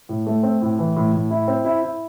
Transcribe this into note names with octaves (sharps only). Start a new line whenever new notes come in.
A2
A3
C4
A2
E3
A2
A2
E4
C4
E4
E4